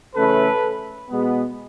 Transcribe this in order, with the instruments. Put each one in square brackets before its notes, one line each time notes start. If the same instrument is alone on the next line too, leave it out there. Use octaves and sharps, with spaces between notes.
[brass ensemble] C#3 E3 A3 C#4 A4 B4
B2 G#3 B3